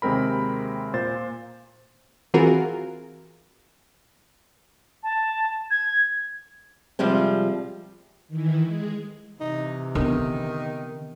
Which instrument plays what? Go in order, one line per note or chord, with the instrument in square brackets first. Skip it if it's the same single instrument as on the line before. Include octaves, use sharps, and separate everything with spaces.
[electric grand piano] D#2 C3 G#3 C4 A#4 B5
A#2 C5 A6
[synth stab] E3 C4 F4 F#4 G#4 A#4
[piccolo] A5
G#6
[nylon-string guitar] C3 F3 G3 G#3 C4
[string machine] D#3 E3 E4
G#3 G#4
[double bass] C3 E3 [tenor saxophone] D#4
[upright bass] D3 B3 [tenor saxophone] D#3